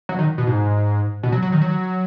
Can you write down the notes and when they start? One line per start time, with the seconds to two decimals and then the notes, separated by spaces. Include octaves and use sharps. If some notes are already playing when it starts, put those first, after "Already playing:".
0.09 F#3
0.18 D#3
0.38 B2
0.47 G#2
1.23 B2
1.32 F#3
1.42 F#3
1.52 D#3
1.61 F#3